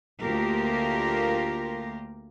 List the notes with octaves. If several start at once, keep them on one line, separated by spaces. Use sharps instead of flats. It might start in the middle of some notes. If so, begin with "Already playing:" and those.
D2 A#3 F4 G4 A#4